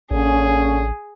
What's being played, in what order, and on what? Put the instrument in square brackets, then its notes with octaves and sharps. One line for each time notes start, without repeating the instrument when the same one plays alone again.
[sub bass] A1 [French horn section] D3 A#3 C#4 [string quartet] G#4